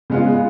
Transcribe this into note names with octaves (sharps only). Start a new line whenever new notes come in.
C#3 G#3 B3 F4